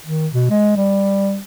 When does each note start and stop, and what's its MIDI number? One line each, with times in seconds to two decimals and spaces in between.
0.06 0.27 51
0.33 0.46 47
0.50 0.75 56
0.76 1.39 55